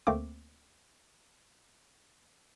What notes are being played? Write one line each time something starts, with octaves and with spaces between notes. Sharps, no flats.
D2 A3 A#3 C4 D6